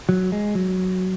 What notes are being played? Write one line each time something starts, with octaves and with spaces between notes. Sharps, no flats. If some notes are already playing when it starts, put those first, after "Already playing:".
F#3
G#3
F#3